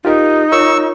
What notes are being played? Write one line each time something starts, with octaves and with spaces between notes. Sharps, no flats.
D#4 F4 G4 A#4
F4 A#4 C#5 C#6 E6